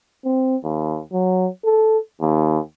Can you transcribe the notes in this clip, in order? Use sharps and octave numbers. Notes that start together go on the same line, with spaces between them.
C4
D#2
F#3
A4
D#2